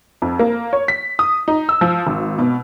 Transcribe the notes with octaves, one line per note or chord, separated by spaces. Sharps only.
F2
A#3
C#5
B6
D#6
D#4
E6
F3
G#1
B2